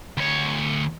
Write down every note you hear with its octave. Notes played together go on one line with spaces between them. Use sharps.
D2 C#5